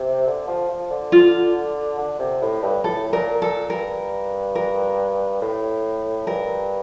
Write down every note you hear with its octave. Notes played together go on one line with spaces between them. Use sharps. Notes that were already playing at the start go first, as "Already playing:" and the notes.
Already playing: C3
D3
F3
F3
D3
F4
D3
C3
A2
G2
A2 A4
A#2 A#4
A#2 A4
G2 A#4
A#4
A2
G2 A#4